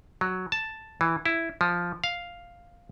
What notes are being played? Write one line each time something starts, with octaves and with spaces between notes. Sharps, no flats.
F#3
A5
E3
E4
F3
F5